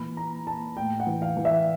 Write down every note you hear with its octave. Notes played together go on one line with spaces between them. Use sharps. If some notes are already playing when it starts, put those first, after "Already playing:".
Already playing: A#2 E3 B5
A#2 A#5
A#2 A5
A2 G5
F#5
E3
F5
E3
E5